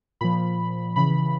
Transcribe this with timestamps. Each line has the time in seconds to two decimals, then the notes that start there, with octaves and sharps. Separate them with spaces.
0.21 A#2 F3 B5
0.96 C#3 E3 B5